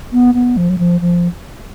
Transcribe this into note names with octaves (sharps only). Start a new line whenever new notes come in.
B3
B3
F3
F#3
F3
F3